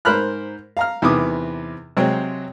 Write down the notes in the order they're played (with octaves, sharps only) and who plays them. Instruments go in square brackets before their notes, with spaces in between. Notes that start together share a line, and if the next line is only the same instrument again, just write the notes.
[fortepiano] G#2 A#4 C5 B5 F6 F#6
F5 A#5 F6
E2 C3 D#3 B3 D6 D#6
C3 F#3 G#3 C4 C#5 G5